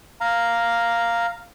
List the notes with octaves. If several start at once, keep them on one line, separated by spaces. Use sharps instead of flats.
F5 A#5